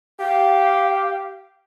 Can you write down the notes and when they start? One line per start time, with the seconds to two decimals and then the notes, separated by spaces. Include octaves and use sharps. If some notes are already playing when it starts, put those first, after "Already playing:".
0.20 G4 F5